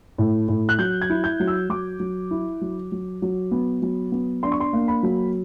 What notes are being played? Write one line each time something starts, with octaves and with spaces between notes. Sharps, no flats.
A2
A2
F#6
F#3 G6
G#6
E4
G6
F#3
E6
F#3 D6
F#3
E4
F#3
F#3
F#3
B3
F#3
B3
D4 C6
C#6
C6
A#3
B5
F#3